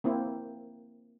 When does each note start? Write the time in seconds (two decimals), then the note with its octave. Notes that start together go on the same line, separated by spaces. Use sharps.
0.04 A#3 C4 E4